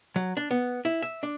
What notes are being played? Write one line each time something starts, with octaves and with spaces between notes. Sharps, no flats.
F#3
D4
B3
E4
E5
D4